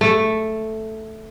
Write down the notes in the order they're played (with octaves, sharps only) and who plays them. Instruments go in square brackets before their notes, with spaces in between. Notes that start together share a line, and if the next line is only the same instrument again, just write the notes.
[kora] A3